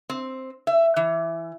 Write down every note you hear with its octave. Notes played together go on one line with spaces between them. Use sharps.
C4
E5
E3